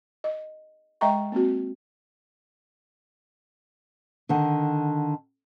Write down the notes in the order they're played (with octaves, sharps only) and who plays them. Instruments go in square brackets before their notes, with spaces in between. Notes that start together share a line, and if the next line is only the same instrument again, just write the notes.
[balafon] D#5
G#3 D#5 E5 G5 A#5 C#6
A#3 C4 F#4
[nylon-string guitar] D3 D#3 F#5